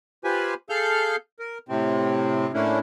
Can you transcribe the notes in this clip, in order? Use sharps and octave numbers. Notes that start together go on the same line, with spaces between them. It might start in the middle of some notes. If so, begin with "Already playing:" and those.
F4 G4 B4 C5 G#5 B5
G#4 A4 F5 F6 G6
A#4
A2 C3 C4
A2 A3 A#3 C#4 D4 E4